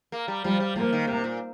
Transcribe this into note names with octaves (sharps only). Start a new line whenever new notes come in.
A#3
G3
F3 G3
G3
F3 A#3
D#3
C3
A#2